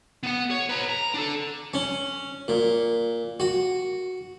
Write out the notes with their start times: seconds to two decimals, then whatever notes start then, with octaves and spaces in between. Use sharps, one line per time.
0.23 B3 F#5
0.51 C#5
0.69 B4 A#5
0.89 A#5
1.14 D4 A4
1.74 C#4
2.48 A#2
3.40 F#4